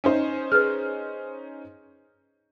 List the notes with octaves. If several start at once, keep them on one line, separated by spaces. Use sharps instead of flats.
C#4 D#4 C5
G#4 B4 F6